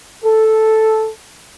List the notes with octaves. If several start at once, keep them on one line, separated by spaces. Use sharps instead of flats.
A4